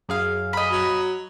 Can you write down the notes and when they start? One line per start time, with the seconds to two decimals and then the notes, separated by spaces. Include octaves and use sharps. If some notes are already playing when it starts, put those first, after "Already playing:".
0.09 F#2 G#4 F5
0.53 D#5 B5
0.72 F#3